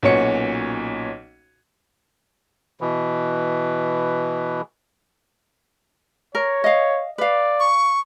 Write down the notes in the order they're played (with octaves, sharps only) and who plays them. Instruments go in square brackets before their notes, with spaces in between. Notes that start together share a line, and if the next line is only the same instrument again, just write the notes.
[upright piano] B1 A#2 C#4 F#4 C#5 C#7
[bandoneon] B2 E3
[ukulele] A#4 [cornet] C#5
[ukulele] D#5 F5
[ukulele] B4 F5 [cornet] D5
[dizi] C#6